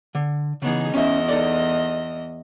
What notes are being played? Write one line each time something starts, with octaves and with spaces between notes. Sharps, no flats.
D3
C#3 E3 B3 D#4 G#4
E2 C#4 E4 D#5 E5
D#4 A4 D5